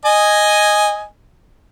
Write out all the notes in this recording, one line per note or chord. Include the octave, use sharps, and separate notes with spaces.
D#5 G#5